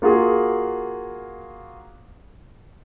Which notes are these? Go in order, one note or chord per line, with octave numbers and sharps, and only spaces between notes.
A#3 F4 F#4 G#4